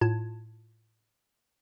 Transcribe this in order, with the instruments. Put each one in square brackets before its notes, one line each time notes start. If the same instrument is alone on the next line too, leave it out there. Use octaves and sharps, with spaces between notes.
[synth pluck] A2 F4 A5 G#6